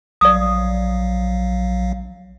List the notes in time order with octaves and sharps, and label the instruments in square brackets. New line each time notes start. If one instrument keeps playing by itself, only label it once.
[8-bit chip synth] A#1 F#3 F5 [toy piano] D5 D#6